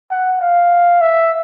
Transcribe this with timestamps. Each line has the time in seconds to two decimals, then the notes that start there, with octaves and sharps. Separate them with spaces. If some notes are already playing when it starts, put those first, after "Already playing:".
0.11 F#5
0.41 F5
1.01 E5